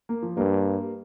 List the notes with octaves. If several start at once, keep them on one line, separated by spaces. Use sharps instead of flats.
A#3
F3
G2 A#3